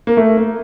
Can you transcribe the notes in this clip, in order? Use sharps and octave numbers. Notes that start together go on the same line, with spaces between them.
A#3
A3
A#3